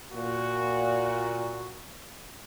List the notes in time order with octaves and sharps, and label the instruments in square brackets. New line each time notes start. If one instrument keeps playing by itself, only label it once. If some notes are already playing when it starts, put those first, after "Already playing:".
[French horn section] A#2 [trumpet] F#4